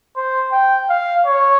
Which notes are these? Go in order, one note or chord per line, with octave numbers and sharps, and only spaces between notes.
C5
G5
F5
C#5